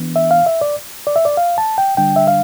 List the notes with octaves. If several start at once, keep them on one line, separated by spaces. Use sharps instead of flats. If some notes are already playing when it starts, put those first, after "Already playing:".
Already playing: E3 B3 D4
E5
F5
E5
D5
D5
E5
D5
F5
A5
G5
D3 G3 D4 G5
E5
F5